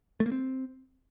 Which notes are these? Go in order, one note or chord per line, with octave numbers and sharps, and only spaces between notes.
A3
A#3
C4